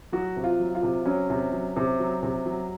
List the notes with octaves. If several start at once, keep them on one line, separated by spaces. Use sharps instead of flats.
F#3 F#4
C3
F4
F#3
F4
C3
F#3 C#4
C3
F#3
C3
F#3
C3
F#3